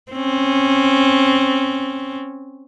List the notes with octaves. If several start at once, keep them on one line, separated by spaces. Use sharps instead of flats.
C4 C#4